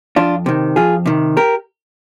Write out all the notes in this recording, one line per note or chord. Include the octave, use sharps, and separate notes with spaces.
F2 D4 F4
C3 D#3
F2 F4 G#4
C3 D#3
G4 A#4